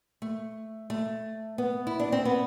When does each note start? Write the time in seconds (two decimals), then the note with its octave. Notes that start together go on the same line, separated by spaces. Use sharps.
0.22 A3
0.90 A3
1.58 B3
1.87 E4
2.00 D4
2.12 C4
2.25 B3